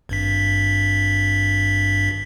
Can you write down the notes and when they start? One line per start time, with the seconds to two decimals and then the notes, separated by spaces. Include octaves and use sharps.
0.09 G#1 G2 B6